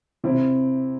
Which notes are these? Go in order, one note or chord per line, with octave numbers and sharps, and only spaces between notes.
C3 C4 E4